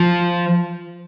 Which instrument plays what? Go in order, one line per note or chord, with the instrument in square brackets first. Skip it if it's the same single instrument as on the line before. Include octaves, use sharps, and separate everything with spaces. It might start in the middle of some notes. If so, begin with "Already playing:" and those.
Already playing: [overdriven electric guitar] F3